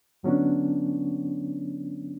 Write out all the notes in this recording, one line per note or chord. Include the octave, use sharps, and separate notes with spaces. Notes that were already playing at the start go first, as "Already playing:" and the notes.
G2 D3 F#3 B3 C#4 D4